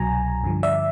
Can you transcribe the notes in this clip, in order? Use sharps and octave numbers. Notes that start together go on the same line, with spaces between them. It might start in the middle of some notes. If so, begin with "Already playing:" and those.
Already playing: C2 B2 F#3 G#5 A#5
G2 D3 F3
D5 E5